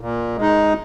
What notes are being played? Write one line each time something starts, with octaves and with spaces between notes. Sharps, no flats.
A#2
G#3 D#4